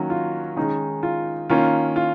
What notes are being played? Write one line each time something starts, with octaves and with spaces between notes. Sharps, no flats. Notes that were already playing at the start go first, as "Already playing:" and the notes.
Already playing: D#3 F#3 A#3 C#4 F#4
F4
D#3 G#3 C#4 D#4
F4
D#3 A#3 C#4 F4
F4